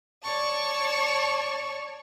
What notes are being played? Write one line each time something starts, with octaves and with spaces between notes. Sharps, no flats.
C#5 D5 A5 C#6